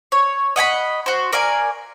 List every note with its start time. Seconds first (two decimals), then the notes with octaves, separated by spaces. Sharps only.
0.12 C#5
0.56 D#5 F#5 G#5 B5
1.06 F#4 C5
1.32 A#4 D5 F5 G#5